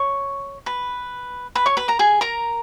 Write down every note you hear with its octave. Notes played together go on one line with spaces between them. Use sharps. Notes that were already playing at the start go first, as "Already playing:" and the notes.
Already playing: C#5 C#6
B4 B5
B4 B5
C#5 C#6
B4 B5
A#4 A#5
G#4 G#5
A#4 A#5